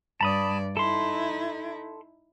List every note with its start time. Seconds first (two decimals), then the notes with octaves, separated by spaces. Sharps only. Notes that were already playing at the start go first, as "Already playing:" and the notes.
0.21 G2 D5 A5 B5 D#6
0.77 D#4 E4 A4 C6